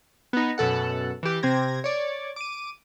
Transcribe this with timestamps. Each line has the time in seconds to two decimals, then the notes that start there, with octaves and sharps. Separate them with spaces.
0.33 B3 D#4
0.58 F#2 B2 A4 F#5
1.23 E3 G4
1.43 C3 C4 G#6 A#6
1.84 C#5 D5
2.36 D6 D#7